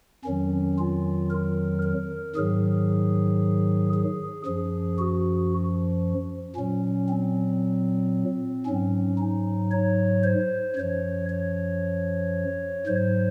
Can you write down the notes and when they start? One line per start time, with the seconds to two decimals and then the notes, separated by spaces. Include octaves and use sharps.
0.25 F2 D#3 F#3 C#4
0.78 F4
1.31 A#4
1.83 A#4
2.36 G#2 D#3 F#3 G#4
3.93 G#4
4.46 F#2 F3 G#4
4.98 F#4
6.56 A#2 F#3 C#4
7.09 C4
8.66 G#2 F#3 C#4
9.18 D#4
9.71 C#5
10.24 C5
10.76 F#2 F3 C#5
11.29 C#5
12.87 G#2 F#3 C5